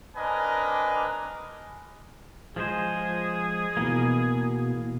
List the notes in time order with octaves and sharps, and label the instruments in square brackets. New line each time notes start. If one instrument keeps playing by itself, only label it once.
[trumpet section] C4 D4 A#4 B4 D#5 G#5
[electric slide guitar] F3 G#3 C5 [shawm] G#4
[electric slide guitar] B2 E3 A#3